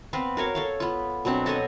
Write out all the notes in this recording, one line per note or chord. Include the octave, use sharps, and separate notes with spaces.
B3 C4 B4 F5
F#4 A#4 C#5 F5
A4 C#5 F5
B3 F4
B2 F#3 C4 D4
F#4 A4 C#5 D#5